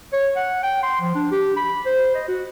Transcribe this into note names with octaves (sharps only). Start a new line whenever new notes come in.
C#5
F#5
G5
C6
F3
D4
G4
B5
C5
D#5
F#4